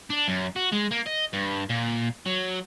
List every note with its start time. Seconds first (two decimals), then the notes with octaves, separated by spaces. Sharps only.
0.10 D4
0.28 F#2
0.56 F#4
0.72 G#3
0.91 A#3
1.07 D#5
1.33 G2
1.69 A#2
2.26 F#3